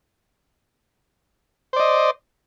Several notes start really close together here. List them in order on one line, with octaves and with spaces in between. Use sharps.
C5 D5 D#5